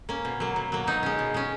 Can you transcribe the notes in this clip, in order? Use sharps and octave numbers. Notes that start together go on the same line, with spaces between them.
A#3 C#4
B2
F#3 A#3
B2
F#3 A#3
B2 D#4
G#3 C#4
B2
G#3 C#4